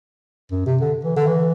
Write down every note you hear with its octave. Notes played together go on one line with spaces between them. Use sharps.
F#2
C3
D3
E3
D3
E3